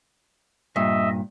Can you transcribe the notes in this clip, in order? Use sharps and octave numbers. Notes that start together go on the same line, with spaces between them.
G2 A#2 D#5 E5